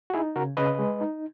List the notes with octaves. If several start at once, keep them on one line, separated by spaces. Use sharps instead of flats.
F#4
D#4 E4 G#4
C#3 F#4 A#4
C#3 B4 D#5
G#3
D#4